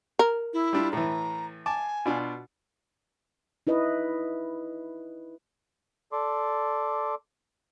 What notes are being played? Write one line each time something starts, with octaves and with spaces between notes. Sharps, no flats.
A#4
E4
G3 D4 F4
A2 E3 A#5
G#5 A5 D6
B2 D4 F4
D#4 E4 B4 D#5
A4 D5 C6 D6